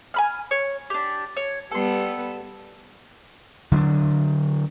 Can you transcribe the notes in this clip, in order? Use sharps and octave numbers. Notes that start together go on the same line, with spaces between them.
G#5 B5 F6
C#5
D4 G4
C#5
G3 B3 A4 B4 C6
D3 F#3 C#4 D4